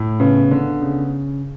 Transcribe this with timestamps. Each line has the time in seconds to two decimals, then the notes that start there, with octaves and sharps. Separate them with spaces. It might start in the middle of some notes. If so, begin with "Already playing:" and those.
Already playing: A2
0.20 C#3 B3
0.51 D3 B3
0.82 C#3